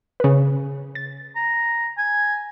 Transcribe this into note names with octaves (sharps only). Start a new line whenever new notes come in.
C#3 B4
A6
A#5
G#5